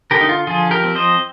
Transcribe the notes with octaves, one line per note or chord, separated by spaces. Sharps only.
D3 G4 A#4
D#4
F4
F3 F4 G#4
G4 A#4
C4
C5 D#5